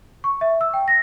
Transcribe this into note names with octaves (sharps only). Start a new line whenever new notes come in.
C#6
E5
E6
G5
A#6